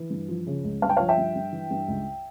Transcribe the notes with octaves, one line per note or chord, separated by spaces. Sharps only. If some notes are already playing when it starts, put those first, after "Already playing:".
Already playing: E3
G2
F3
C#3
C#2
G2 F5
G5
F3 C#5 F5
E5 G5
G2
G2
E3
G2
C#2